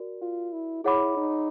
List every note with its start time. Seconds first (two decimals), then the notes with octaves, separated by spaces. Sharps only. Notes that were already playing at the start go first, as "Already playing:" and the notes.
Already playing: F#4 A#4 D5
0.21 F4
0.52 E4
0.84 E4 G#4 C#5 F#5 B5 D6
1.17 D#4